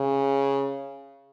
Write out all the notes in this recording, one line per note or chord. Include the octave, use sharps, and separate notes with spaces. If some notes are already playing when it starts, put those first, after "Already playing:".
Already playing: C#3